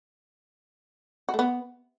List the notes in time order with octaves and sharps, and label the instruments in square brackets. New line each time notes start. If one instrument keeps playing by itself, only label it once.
[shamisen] F#4
A3
B3